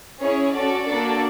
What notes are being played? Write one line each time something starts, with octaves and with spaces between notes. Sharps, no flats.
C#4 E4 G#4 C#5
C#4 F#4 A4 D5
A#3 D4 F#4 A4